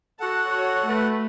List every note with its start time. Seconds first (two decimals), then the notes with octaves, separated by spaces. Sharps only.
0.20 F#4 A4 F#5 A5
0.48 C#5
0.86 A3 F#4 B4